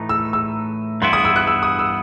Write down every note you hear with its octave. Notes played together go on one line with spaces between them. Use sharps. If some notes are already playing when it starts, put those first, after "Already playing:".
Already playing: A2 E3 A3 D#4
E6
E6
G2 E3 B3 E4 C6
D#6
E6
F#6
E6
D#6
E6